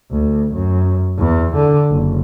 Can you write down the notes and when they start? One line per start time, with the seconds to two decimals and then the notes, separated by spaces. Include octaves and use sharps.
0.11 D2
0.54 F#2
1.19 E2
1.55 D3
1.90 F#1